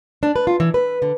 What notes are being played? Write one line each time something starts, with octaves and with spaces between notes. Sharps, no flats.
D4
B4
F4
E3
B4
D3